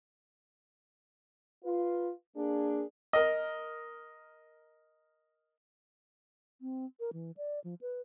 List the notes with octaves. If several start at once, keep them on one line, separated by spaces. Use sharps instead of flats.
F4 B4
A#3 D4 G#4
A#4 D#5
C4
A#4
E3
D5
F3
B4